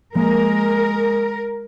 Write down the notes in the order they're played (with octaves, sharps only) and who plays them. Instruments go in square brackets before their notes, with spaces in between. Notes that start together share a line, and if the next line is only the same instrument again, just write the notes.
[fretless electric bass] F3 A#3 [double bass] G#3 [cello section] A#4